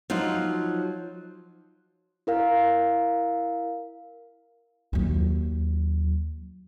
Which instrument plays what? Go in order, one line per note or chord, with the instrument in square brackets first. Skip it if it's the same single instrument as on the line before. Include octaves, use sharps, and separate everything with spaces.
[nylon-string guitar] F3 F#3 D#4 F4
[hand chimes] E4 A#4 F5
[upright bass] D#2 F#3